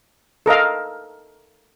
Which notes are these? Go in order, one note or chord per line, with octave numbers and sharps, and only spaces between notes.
A4 A#4 D#5 F5